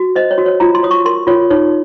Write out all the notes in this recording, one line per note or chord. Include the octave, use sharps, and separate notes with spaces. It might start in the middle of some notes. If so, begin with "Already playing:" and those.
Already playing: F#4
C5 D#5
C#5
F#4
C#5
F4 A#5
C6
C#5 D#6
C#6
A#4 C6
F4 C#5
D#4 C#5